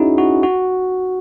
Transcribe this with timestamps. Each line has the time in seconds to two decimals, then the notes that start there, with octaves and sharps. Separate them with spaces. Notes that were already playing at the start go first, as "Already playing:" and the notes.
Already playing: C#4 D#4 E4 F#4 G#4
0.18 F#4
0.43 F#4